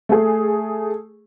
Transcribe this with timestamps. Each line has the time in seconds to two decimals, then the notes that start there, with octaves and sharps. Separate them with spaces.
0.09 A3 G#4